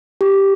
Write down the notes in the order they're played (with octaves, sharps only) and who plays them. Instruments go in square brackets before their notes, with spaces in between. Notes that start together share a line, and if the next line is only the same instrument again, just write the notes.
[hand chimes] G4